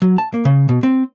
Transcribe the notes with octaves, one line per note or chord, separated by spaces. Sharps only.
F#3
A5
A#3
C#3
B2
C4